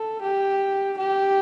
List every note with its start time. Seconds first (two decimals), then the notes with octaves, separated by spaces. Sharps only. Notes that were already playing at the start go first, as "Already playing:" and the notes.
Already playing: A4
0.22 G4
0.98 G4